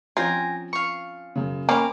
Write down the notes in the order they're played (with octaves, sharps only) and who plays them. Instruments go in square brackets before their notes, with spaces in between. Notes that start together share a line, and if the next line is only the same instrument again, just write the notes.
[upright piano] F3 C4 C#4 [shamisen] F4 [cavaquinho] G5 G#5 A#5
[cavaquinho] F5 C#6
[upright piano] F#2 C#3
[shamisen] A#3 C#4 [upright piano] C5 G5 [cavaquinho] A#5 B5 D6